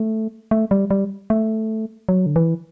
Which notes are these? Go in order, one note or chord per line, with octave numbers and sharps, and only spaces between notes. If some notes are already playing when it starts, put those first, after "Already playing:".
Already playing: A3
A3
G3
G3
A3
F#3
D3
E3